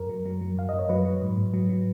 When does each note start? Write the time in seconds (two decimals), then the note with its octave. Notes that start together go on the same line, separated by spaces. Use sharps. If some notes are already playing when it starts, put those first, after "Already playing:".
Already playing: F#2 A#4
0.09 F#3
0.26 F#3
0.41 F#3
0.57 F#2 F5
0.69 F#2 D#5
0.79 C#5
0.89 F#3 B4
1.05 F#3
1.22 G#2
1.37 G#2
1.54 F#3
1.69 F#3